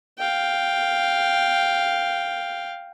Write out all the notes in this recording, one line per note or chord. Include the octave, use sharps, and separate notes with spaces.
F5 G5